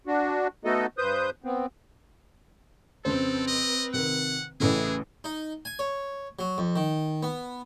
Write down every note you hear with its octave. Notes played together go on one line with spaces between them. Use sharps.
D4 F#4
A3 B3 D#4 F#4 A4 D#5
G2 B4 C5 D#6 G6
B3 C4
F2 C#3 C4 A4 B4 C5
D#5
C3 D#3 F#5
A1 A2 C#3 E3 G#4
D#4
G#5
C#5
F#3
F2
D#3
B3